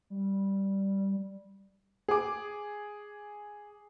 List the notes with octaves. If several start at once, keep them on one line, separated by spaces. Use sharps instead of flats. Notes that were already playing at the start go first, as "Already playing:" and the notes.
G3
G#4 D6